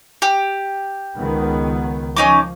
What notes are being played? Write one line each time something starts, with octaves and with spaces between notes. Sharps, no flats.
G4
C#2 D#3 B3
F3 C#4 D#4 D6